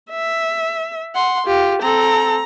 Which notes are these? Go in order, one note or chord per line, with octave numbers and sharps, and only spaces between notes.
E5
F#5 C6
F4 G4
C4 A4 A#5